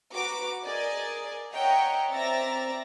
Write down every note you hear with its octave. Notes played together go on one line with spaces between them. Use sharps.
F#4 B4 A#5 D6
G#4 A#4 D5 D#5 G#5
C#5 D#5 E5 F#5 G5 A#5
C4 D5 E5 A#5 A6 A#6